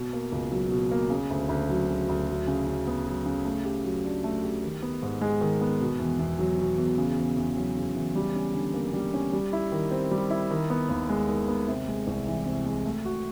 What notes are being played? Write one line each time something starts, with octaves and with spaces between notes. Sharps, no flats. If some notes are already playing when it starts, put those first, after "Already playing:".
Already playing: B2
A#3
C#2
F#3
B2
A#3
C#3
D2
D2
F#3
C#3
D2
F#3
C#3
C#3
B3
F#3
C#3
A3
G4
F#3
D4
A3
G4
D#3
B3
G#2
G#3
D#3
B3
B2
E2
E2
F#3
B2
E2
C#3
E2
E2
F#3
C#3
E2
G3
C#4
D3
A#3
G3
C#4
G3
E4
D#3
C4
G3
E4
D#3
B3
D#2
G#3
D#3
B3
C3
G#3
C2
E3
C3
G#3
A3
F#4